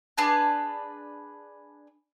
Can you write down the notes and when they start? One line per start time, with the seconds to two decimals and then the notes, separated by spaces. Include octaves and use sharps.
0.18 D4 G#4 B4 A5